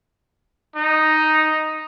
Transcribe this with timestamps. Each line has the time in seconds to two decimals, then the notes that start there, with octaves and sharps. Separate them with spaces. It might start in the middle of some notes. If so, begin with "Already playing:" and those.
0.76 D#4